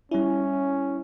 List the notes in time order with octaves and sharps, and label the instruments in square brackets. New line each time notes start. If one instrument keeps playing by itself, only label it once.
[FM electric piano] G3 E4 [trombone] C#4